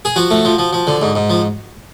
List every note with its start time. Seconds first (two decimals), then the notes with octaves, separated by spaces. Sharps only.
0.05 G#4
0.16 F3 F#4
0.31 A3
0.45 F3
0.59 F3
0.73 F3
0.87 D3
1.02 G#2
1.15 G#2
1.30 F3